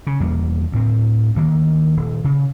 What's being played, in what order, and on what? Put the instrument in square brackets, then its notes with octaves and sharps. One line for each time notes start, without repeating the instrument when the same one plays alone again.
[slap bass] C#3
E1 E2 G3 A#3
D2 A2 C4
D2 D#3 A#3
D#1
C#3